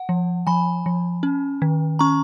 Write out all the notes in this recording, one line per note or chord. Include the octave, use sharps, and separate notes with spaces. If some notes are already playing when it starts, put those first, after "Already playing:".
Already playing: F#5
F3
F3 G#5 B5
F3
C#4
D#3
C#4 A#5 C#6